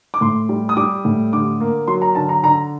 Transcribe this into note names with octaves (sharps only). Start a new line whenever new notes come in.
D6
A2 C6
G3
D#6
G3 D6
A2
D3 D6
A#3
F#3 C6
A#5
D3 A5
A#5
D3 A#5